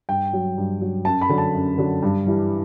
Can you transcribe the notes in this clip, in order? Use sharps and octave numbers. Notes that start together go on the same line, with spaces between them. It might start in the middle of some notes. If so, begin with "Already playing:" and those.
G2 G5
F#3
G2
F#3
F#2 A5
B5
D3 F#3
A5
F#2
D3 F#3
G2
E3 G3